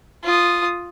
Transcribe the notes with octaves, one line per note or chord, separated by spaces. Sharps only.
F4 D#6